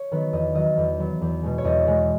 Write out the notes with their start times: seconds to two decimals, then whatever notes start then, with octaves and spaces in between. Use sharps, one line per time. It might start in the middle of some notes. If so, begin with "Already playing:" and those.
Already playing: C#5
0.12 D#3 F#3 B3 B4
0.33 E2 D#5
0.54 D#3 F#3 B3 D#5
0.78 E2
0.99 D#3 F#3 B3
1.21 E2
1.43 B2 G#3
1.58 C#5
1.64 E2 D#5
1.86 B2 G#3